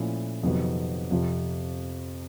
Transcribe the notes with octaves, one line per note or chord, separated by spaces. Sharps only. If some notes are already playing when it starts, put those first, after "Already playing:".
Already playing: A#2 F3 A3 C#4 E4
F2 C3 D#3 F#3 B3
F2 C3 F3